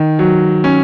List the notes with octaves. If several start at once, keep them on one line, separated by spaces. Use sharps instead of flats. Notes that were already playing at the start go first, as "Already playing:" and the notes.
Already playing: D#3
F#3
C#4